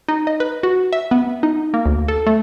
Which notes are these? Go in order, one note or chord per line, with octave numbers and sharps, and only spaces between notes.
D#4
D#5
B4
F#4
E5
B3
D#4
A#3
D2
A4
A3